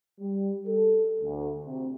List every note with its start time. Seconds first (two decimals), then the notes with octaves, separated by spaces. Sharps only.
0.19 G3
0.66 A4
1.20 D2
1.65 C3